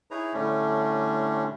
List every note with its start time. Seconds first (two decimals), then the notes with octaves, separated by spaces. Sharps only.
0.11 D#4 E4 G#4 B4 C#5 A#5
0.34 A2 D3 G3 A3 C#4 D4